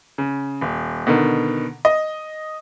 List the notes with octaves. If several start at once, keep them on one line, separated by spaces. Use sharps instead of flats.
C#3
D#1
B2 D3 D#3
D#5